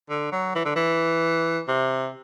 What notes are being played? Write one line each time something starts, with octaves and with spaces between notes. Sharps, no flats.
D3
F#3
E3
D3
E3
C3